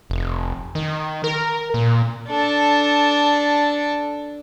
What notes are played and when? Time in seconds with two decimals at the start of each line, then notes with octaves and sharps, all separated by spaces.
0.10 F1
0.75 D#3
1.24 A#4
1.74 A#2
2.27 D4 A4